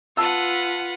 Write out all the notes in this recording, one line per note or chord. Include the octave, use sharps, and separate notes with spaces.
F4 B4 F#5 A5 E6